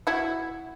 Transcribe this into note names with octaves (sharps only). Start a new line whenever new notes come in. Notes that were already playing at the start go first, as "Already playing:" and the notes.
E4 F#4